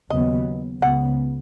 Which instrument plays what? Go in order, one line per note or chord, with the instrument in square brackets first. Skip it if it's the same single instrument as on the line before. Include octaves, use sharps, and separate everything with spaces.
[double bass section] D#2 C#3 F#3 B3 [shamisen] D#5
[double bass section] C#2 C#3 B3 [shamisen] F#5